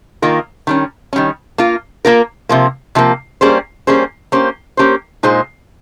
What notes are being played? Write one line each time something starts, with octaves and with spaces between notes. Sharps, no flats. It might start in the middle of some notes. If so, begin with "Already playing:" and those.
D#3 A#3 F4 A#4
D#3 G3 C#4
D#3 G3 C#4
A#3 F4 A#4
A#3 F4 A#4
C3 F3 A#3
C3 F3 A#3
G3 A#3 C#4 G#4 C5
G3 A#3 C#4 G#4 C5
A#3 C#4 G4 C5
A#3 C#4 G4 C5
A#2 G#3 D#4 G#4 C5